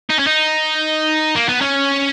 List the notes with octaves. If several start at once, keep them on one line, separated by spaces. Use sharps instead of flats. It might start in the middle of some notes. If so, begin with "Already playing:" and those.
D#4
C#4
D#4
A#3
B3
C#4